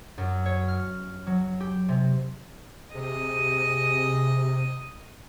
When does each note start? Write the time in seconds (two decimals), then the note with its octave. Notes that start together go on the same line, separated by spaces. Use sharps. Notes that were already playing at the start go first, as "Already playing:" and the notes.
0.18 F#2
0.46 C#5
0.68 F6
1.27 F#3
1.60 G4
1.89 C3
2.95 C3 G4 G#4 D#5 D#7